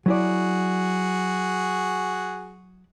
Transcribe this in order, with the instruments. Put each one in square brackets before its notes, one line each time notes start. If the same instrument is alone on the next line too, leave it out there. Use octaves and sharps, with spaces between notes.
[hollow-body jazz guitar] F#3 E4 D5 [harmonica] F#4 G#4